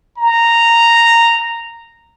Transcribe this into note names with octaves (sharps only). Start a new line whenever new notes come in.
A#5